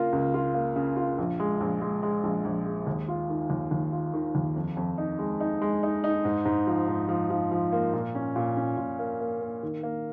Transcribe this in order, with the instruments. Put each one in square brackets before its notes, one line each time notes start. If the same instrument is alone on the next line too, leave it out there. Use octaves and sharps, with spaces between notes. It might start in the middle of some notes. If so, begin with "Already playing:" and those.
Already playing: [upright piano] C#3 A#3 F4
C#2
F4
A#3
C#3
F4
A#1
G#3
A#1
G#3
G#3
A#1
A#1
G#3
D#2
F4
D#3
D#2
D#2
F4
D#3
D#2
F2
F2
D#4
G#3
D#4
G#3
D#4
D#4
G#2
G#2
F3
G#2
F3
F3
F3
A#3
A#2
C#4
A#2
C#4
A#2
A#3
A#3
A#3
D#3
A#3